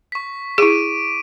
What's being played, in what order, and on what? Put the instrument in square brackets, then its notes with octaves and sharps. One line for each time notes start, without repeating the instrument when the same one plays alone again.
[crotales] C#6 B6
[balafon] E4 G#4 [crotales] D6 D7 D#7